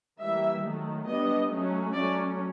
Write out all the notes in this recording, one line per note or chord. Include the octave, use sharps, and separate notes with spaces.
E3 G3 A#3 E5
D#3 F#3 A3
G3 B3 D4 D#5
F#3 A3 C#4
F#3 A3 C#4 D5